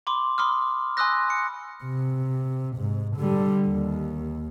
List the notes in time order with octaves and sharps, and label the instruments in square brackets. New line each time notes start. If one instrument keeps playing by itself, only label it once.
[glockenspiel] B5 C6 D6
B5 C6 D6 D#6 F6
G#5 C6 D#6 E6 F#6 A#6
C#7
[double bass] C3
G#2
D3 G3
D#2